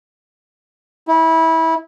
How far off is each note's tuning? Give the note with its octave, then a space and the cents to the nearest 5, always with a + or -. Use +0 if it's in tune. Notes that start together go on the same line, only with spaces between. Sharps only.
E4 -25